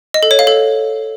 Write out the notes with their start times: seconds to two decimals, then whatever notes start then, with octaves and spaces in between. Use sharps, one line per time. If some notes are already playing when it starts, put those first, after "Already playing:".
0.14 D#5
0.23 A4
0.31 C#5
0.39 F5
0.47 A4